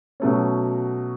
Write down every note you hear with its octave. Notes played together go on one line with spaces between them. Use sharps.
B2 F#3 A3 C#4